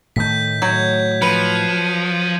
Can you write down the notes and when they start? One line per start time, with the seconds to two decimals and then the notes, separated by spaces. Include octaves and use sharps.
0.16 A2 D#3 A3 G6 B6
0.62 F#3 G6 G#6
1.22 F3 B4 C#7 D#7